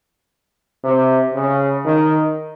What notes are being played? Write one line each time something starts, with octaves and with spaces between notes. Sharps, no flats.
C3
C#3
D#3